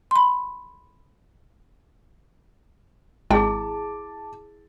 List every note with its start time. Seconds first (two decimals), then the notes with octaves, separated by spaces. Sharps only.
0.11 B5 C6
3.30 G#1 G#3 E4 G#4 G5 A5 D6